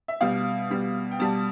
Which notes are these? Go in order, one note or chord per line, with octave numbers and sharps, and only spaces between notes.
E5
B2 G3 F5
B2 G3
G5
B2 G3 A5